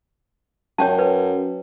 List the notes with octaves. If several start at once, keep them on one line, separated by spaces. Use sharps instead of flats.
F#2 C#5 G5 A5
B4